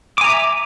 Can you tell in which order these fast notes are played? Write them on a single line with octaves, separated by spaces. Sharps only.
D6 G#5 A#5 E5